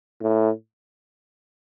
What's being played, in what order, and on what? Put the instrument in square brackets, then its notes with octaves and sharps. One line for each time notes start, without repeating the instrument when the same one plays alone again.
[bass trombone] A2